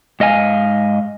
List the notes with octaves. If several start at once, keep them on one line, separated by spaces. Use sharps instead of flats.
G#2 D#5 F5 G#5